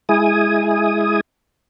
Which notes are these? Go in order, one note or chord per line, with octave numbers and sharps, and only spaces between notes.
G#3 E4 G#5 D#6